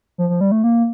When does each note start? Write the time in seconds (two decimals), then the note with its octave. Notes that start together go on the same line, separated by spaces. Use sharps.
0.18 F3
0.29 F3
0.41 G3
0.52 A3
0.64 A#3